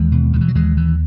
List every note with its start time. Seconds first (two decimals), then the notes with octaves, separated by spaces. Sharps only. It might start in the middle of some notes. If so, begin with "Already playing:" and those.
Already playing: D#2 E3 G#3
0.12 B2
0.33 B2 D#3
0.41 E3
0.48 F#3
0.55 D#2 E3 G#3
0.77 D#2 E3